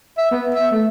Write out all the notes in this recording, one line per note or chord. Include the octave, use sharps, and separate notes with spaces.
E5
B3
E5
A3